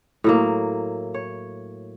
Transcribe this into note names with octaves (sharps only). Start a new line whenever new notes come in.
A2 F#3 A#3
C#5